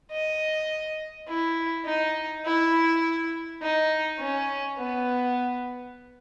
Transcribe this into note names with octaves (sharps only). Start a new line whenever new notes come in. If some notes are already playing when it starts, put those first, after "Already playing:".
D#5
E4
D#4
E4
D#4
C#4
B3